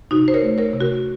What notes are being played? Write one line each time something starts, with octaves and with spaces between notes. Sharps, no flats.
C3 D#4 F#4
C5
A#4 C#5
A3
A#4 C#5
C3
F#4 A#4